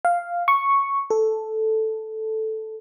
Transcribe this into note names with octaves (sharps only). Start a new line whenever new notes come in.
F5
C#6
A4